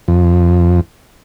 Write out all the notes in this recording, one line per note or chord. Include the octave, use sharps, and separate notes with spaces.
F2